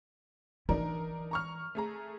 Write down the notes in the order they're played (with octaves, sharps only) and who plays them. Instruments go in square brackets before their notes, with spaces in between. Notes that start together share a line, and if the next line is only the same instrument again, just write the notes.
[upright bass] E3 [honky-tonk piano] D4 D#4 A#4
[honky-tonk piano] A#5 C#6 F6
A3 G#4 A#5